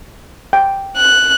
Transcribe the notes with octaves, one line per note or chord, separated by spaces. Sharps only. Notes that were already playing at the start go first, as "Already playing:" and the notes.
G5
F#6